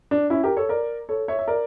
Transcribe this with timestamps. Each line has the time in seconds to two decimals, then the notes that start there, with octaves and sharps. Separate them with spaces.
0.11 D4
0.30 C#4 E4
0.44 G4 A#4
0.57 A4 C#5
0.69 A#4 D5
1.09 A4 C#5
1.28 C#5 E5
1.39 E5
1.48 A#4 D5